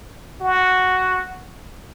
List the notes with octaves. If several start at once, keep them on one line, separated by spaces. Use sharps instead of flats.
F#4